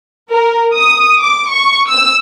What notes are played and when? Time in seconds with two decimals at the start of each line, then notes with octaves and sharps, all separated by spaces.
0.31 A#4
0.74 D#6
1.21 D6
1.51 C#6
1.89 E6